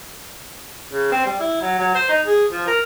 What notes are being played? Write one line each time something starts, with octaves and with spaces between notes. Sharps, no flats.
C#3
C4
G3
E4
F#3
F#3
C5
D#4
G#4
F3
A#4